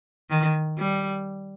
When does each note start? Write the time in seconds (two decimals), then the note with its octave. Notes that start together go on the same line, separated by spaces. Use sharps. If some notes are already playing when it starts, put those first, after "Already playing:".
0.30 D#3
0.78 G3